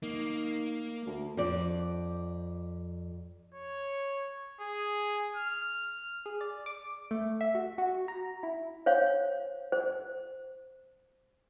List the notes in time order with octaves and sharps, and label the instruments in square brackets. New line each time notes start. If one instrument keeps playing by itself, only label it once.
[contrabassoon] D#3 [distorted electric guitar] A#3
[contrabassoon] D2
[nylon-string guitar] F2 D5
[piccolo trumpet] C#5
G#4
F6
[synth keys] G#4
D5
D6
A3
E5
F#4
F#4
A#5
E4
[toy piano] C5 C#5 F5
C5